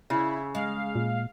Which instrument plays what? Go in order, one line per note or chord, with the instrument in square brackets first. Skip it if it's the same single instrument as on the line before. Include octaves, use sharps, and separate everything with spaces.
[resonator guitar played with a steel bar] C#3 [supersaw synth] E4
[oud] G#3 [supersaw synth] F5
[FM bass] A#2